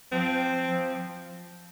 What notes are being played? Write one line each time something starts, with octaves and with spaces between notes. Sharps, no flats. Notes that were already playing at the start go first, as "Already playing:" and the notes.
F3 C4
F3